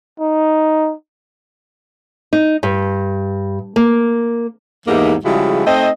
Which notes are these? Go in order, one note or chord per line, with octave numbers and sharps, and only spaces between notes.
D#4
D#4
G2
A#3
E2 G#2 E3 A#3 D#4 G4
C#3 F3 G3 G#3 E4 F#4
A3 C4 D#4 C5 D#5